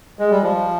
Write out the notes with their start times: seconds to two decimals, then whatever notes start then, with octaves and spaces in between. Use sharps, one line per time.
0.19 G#3
0.30 G3
0.42 F3